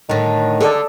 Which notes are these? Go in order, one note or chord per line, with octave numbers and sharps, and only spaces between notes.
A2 D3 D#3
D3 G#4 A4 D5